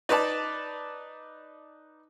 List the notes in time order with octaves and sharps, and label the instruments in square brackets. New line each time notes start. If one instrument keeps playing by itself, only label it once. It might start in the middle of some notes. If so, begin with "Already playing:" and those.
[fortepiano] D#4 B4 D5 A5